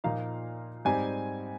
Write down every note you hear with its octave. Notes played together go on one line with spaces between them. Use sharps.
A#2 F3 A#3 D#4 F5
G#2 G3 C4 D#4 G#5